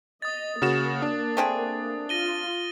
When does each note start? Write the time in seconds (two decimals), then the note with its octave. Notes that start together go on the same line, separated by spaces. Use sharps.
0.22 D#5 D#6 A6
0.62 C#3 A#3 F#4 E7
1.02 D4
1.37 A3 C4 G#4
2.09 F4 A#6 D#7 G7